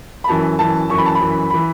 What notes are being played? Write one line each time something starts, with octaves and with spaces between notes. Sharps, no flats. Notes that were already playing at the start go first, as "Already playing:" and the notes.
B5
F#2 E3 A5
F#2 E3 A5
F#2 E3 C#6
B5
A5
B5
F#2 E3
E3 B5